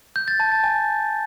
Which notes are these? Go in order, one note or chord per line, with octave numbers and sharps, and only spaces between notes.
G6
A6
A5
A6
G#5